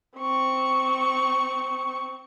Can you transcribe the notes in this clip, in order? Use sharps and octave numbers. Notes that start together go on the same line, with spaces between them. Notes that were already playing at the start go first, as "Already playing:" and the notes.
C4 C#6